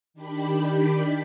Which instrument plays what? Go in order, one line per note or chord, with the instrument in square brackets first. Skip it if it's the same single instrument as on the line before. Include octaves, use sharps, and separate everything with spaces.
[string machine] D#3 D4 G4 B5 B6